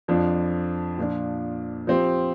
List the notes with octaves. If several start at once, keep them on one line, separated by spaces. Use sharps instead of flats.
F2 F3 D4
A#2 F3 D4
F3 C4 G4